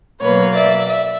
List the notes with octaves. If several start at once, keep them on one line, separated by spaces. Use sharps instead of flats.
B2 F#3 A#3 B4 C#5
D5 E5
E5